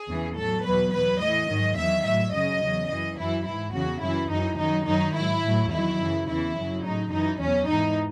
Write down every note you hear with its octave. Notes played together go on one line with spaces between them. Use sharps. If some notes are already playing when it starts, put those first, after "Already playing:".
Already playing: G#4
E2 C#3 E3
A2 F#3 A4
E2 B2 F#3 B4
E2 B2 F#3 B4
A2 E3 D#5
G#2 D#3 F#3
E2 D#3 F#3 E5
A2 F#3 E5
F#2 C#3 F#3 D#5
E2 C#3 F#3
F#2 E3 D#5
F#2 E3 E4
G#2 E3 E4
E2 C#3 F#3 F#4
F#2 E3 E4
F#2 E3 D#4
F#2 D#3 F#3 D#4
F#2 D#3 F#3 D#4
G#2 F#3 E4
A2 F#3
E2 D#3 F#3 E4
F#2 C#3 E3
E2 C#3 E3 E4
F#2 C#3 F#3
A2 F#3 D#4
F#2 E3 D#4
E2 B2 F#3 C#4
G#2 E3 D#4